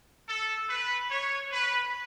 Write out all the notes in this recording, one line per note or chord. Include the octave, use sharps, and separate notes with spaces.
A4
B4
C#5
B4